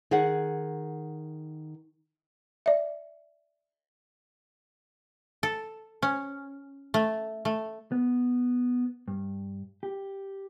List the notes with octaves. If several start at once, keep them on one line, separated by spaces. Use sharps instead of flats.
D#3 G#4 F#5
D5 E5
A4
C#4
A3
A3
B3
G2
G4